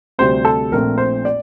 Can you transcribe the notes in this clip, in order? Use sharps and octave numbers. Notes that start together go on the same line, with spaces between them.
D2 C3 G3 C4 C5
A4
A#1 A#2 A3 C4 A#4
C5
D5